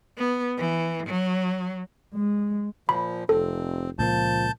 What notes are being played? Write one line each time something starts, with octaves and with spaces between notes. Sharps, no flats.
B3
E3
F#3
G#3
A#2 F3 B5
F1 C4 A4
C#2 A#2 F3 A#3 A5 G6